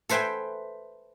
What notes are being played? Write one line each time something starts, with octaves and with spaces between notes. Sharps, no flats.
A4 B4 C5 E5 G5 G#5